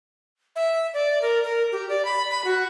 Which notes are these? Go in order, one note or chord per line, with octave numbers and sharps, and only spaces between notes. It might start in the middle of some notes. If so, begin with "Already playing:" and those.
E5
D5
A#4
A#4
G4
D5
B5
B5
F#4